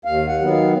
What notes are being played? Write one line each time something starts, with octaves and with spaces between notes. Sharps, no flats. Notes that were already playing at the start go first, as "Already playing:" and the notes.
D#2 F5
F#5
D#3 F#3 B3
F5